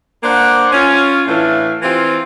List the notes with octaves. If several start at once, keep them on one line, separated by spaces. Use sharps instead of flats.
A#3 D4 C5 F#5
C#4 F4
A2 E3 A3 D4 F5
E3 C4 F4